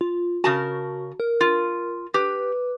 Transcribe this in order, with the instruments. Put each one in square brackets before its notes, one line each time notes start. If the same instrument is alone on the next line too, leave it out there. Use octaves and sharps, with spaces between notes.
[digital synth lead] F4
[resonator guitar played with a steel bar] C#3 A#4 A5 [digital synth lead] F#4
[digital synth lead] A#4
[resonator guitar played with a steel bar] F4
[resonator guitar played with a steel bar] G4 [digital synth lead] B4